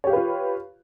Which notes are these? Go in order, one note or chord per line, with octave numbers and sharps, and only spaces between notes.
F4 G4 B4 C#5 F5